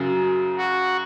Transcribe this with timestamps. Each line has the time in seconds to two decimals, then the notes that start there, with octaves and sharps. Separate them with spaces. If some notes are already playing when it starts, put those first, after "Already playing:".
Already playing: F#2 C#3 F#3
0.57 F#4